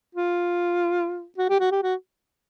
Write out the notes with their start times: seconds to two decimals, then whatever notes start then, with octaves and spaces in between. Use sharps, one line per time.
0.15 F4
1.38 F#4
1.50 G4
1.60 F#4
1.71 G4
1.83 F#4